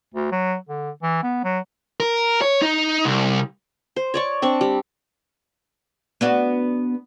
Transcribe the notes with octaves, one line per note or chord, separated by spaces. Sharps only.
D2
F#3
D3
E3
B3
F#3
A#4
C#5
D#4
C2
C5
C#5 D5 C#6
C4 D4 C#6
G3
B3 D4 F#4